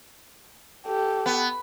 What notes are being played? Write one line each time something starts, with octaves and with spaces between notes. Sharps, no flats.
G4 A4
B3